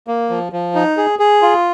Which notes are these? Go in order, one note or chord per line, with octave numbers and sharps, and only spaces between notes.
A#3
F3
F3
D#4
G#4
G#4
F4